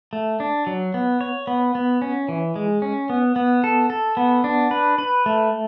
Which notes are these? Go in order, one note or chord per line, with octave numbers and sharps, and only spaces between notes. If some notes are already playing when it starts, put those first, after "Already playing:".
A3
D4
F#3
B3
C#5
B3
B3
C#4
E3
G#3
C#4
B3
B3
A4
A4
B3
D4
B4
B4
A3